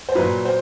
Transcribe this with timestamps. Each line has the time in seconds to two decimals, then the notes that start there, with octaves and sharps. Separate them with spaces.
0.09 C5
0.15 A#2 F#3 B4
0.45 C5